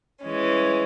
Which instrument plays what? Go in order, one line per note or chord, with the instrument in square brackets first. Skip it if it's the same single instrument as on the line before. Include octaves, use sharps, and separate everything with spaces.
[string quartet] E3 G#3 C#4